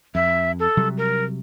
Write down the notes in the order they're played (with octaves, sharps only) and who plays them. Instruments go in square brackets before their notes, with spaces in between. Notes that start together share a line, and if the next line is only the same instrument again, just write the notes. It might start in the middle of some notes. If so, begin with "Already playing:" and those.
[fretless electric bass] F2 [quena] E5
[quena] A4
[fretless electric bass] C3 F#3 G3
[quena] A#4